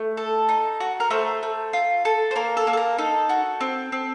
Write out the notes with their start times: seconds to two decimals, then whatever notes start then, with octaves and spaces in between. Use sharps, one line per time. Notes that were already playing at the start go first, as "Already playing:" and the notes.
Already playing: A3
0.17 A4
0.49 D#4
0.80 F#4
1.00 A#4
1.10 A3 C5
1.43 A3
1.73 F4
2.05 A4
2.31 C5
2.36 A#3 A#4
2.57 A4
2.67 A#3
2.73 A4
2.77 A#4
2.98 D#4 A4
3.29 F#4
3.61 C4
3.92 C4